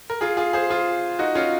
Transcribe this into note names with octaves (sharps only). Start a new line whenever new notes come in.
A#4
F4 G#4
F4 G#4
G#4 C5
F4 G#4
D#4 F#4
C#4 F4